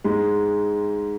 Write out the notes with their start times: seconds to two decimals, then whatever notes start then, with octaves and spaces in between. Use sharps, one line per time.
0.04 G#2 G#3